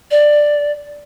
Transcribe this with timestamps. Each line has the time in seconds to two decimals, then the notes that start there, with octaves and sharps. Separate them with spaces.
0.11 D5